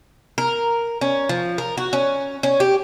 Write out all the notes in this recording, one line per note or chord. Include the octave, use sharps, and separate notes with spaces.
A#4
C#4
F3
A#4
F#4
C#4
C#4
G4